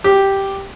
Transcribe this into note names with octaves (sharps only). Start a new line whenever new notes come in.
G4